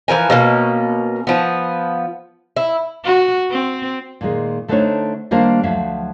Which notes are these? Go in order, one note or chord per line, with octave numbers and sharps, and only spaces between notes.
E3 F3 A#4 G#5
B2 A3 A#3 C#4
F3 B3
E4
F#4
C4
A#2 D#3 G#3
D3 A3 D4 D#4 C5 C#5
D#3 G3 A#3 D4 G4 C5
D2 F3 F#3 E5 F5